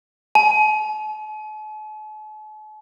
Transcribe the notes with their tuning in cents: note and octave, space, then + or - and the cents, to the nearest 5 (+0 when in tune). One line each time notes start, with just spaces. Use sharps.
A5 -45